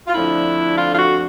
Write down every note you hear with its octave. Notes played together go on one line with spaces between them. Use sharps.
F4
F2 D3 F3 A3 D4 E4
F4
F4
F#4